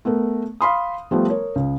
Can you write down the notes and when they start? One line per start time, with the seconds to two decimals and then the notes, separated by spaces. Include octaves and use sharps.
0.05 A3 B3 A#4
0.61 F5 B5 C6 D#6
1.11 F3 G3 A3 B3
1.30 A#4 C#5
1.55 C#2